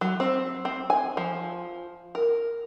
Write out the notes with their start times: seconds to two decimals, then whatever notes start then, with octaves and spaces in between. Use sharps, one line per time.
0.01 F#3
0.20 C4
0.65 C4
0.90 G#5
1.17 F3
2.15 A#4